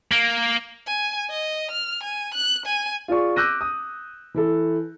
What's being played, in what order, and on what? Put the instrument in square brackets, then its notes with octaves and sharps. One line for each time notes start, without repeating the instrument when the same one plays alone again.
[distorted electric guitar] A#3
[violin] G#5
D#5
F6
G#5
F#6
G#5
[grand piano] F4 G#4 D5 C#6
D6 E6 F#6 G6 A#6 D#7
D#6
E3 E4 A4